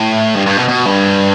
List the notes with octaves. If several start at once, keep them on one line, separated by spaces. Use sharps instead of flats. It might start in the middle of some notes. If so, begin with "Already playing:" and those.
Already playing: A2
G2
G2
B2
B2
G2